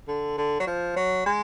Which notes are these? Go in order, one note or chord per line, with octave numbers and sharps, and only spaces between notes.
D3
D3
F#3
F3
F#3
G#3